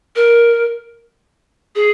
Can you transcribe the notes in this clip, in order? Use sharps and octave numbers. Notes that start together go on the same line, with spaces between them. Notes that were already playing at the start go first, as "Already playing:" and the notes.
A#4
G#4